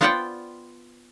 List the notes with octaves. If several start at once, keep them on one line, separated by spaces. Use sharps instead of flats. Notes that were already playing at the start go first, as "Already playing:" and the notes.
B3 F4 C5 D5 F#5 G5